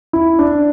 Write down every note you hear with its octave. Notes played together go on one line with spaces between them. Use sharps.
E4
D4